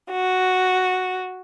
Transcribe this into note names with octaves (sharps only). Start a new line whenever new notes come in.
F#4